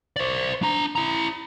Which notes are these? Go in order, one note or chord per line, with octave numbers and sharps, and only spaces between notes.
C5 D5
D4 A#5
E4 A#5